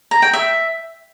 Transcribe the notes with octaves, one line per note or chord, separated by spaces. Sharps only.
A#5
G5
E5